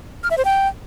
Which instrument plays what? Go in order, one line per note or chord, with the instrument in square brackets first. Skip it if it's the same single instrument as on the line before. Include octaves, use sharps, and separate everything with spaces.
[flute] F6
E5
C5
G5